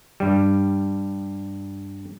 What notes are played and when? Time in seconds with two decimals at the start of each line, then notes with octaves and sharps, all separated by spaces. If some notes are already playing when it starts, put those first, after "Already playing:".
0.20 G2 G3